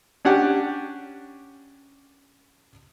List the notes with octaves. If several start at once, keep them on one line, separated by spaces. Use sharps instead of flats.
C#4 D4 G4 F#5